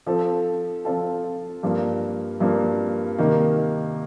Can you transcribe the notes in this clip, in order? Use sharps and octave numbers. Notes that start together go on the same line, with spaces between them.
F3 C4 F4 A4
F3 C4 F4 A4
G2 F3 A#3
G2 F3 A#3
C3 D#3 A#3